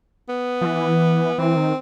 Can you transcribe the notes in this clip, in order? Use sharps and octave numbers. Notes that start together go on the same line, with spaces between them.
B3
F3
E3
E3 C4
D#3